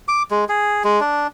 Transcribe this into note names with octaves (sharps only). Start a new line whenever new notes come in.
D6
G#3
G#4
G#3
D4